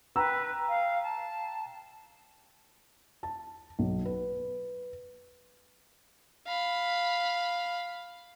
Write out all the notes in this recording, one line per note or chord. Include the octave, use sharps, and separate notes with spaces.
B4 G5 A#5 E6
F5
A5
A5
B1
B4
F5 B5